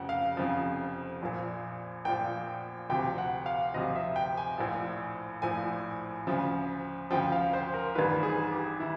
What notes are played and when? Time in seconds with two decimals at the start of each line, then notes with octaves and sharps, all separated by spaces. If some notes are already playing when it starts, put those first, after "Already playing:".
Already playing: F1 F2 C#3 F3 F#5
0.09 F5
0.37 F1 F2 C#3 F3
1.22 A#1 A#2 F3
2.05 A#1 A#2 F3 G5
2.89 D2 C3 F3 G5
3.18 F#5
3.46 F5
3.74 D2 C3 F3 D#5
3.95 E5
4.16 G5
4.37 G#5
4.58 A#1 A2 F3
5.42 A#1 A2 F3 G#5
6.27 D2 C#3 F3
7.11 D2 C#3 F3 G5
7.32 F5
7.53 C5
7.74 A#4
7.95 A1 G2 D#3 B4
8.23 G#4
8.52 G4
8.80 D#3 E4